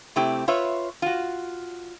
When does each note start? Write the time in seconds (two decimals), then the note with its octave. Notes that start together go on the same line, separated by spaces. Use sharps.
0.16 C3 A3 C4 E4 G4
0.48 F4 B4 C#5 E5
1.02 F4 F#4